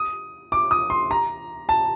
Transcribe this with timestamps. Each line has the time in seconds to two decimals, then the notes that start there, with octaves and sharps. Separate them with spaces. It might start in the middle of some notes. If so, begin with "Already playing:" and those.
Already playing: D#6
0.52 D6
0.71 D#6
0.90 C6
1.11 A#5
1.69 A5